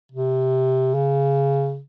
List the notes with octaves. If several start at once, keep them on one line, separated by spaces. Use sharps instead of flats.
C3
C#3